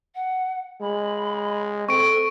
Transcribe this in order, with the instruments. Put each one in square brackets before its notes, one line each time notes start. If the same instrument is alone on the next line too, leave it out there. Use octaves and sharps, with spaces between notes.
[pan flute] F#5
[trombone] G#3 [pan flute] B5
[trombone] C4 [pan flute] A4 [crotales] C#6 D7